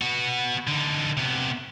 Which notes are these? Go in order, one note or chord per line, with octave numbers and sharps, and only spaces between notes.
B3 F#4
D3 D#4
C3 B3